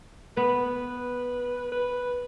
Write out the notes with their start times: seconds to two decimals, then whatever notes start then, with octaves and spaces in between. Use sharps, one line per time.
0.37 B3 B4
1.72 B4